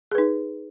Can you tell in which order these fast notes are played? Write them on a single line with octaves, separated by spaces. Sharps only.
G#4 B4 D#4